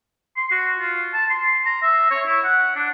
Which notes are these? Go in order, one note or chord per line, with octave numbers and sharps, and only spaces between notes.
C6
F#4
F4
A5
C6
A#5
E5
C#5
E4
F#5
D4